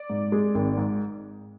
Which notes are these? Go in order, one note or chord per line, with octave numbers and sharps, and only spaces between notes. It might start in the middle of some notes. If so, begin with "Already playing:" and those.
Already playing: D5
G#2
G#3
G#1
G#2